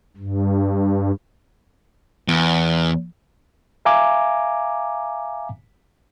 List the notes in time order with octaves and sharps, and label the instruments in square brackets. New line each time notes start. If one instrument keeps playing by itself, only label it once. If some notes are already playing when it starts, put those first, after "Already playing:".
[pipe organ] G2
[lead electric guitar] E2
[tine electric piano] E5 F5 G#5 A#5 D6